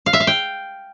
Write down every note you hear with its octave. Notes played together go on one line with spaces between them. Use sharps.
F5
E5
F5
G5